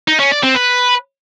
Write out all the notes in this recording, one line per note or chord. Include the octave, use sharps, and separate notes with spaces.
D#4
C#4
D5
C4
B4